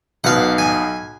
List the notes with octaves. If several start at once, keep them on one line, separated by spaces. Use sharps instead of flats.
B1 B2 F5 F#5
G#5